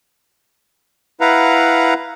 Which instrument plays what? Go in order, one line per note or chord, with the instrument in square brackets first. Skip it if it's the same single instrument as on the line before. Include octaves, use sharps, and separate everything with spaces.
[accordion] E4 B4 F5 F#5 A#5